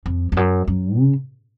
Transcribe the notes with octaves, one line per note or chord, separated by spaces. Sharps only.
F2
F2
F#2
F#2
C#3